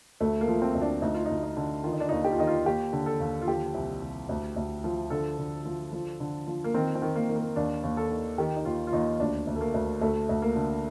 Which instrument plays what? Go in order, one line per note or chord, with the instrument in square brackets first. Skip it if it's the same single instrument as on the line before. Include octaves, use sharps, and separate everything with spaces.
[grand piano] D2 A3
A#3
F3
C4
D2
D4
D2 D#4
F4
D2 D#4
D#4
D3
D#3 F4
D#4
D4
D#2 D#4
G4
F4
D#3 D#4
F4
D#2 G4
D3
A4
D#2
F4
F3 G4
C2
C2
D2
D2
F3
D3 A4
D3
F3
F3
D3
F3
A#3
D#3 C4
C4
D#3
A#3
D#3
A#3
D#2 D4
D#2
A4
D#3
D#3 G4
D#4
D#2 F4
F4
D#2 D#4
D2 D4
D2
A3
A#3
D2
D2 A3
D2
A#3
D3